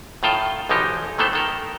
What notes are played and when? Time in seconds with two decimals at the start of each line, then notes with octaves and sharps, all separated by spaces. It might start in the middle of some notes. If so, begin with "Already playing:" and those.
0.23 A2 D#3 F4 A4 G5
0.69 B1 E3 F3 D#4 G4
1.18 D#3 E3 A3 B3 A4 C5
1.33 D#3 A4 A#4